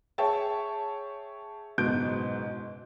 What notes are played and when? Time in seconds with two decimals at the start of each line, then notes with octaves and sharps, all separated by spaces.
0.18 G#4 C#5 E5 G5 A5
1.78 F#1 G#2 B2 G6 D7